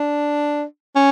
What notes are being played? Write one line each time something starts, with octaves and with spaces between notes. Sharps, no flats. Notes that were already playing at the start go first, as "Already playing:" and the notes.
Already playing: D4
C#4